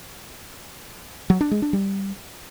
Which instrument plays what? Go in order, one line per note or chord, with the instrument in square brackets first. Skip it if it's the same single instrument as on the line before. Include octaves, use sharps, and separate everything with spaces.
[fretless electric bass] F#3
D4
G#3
D4
G3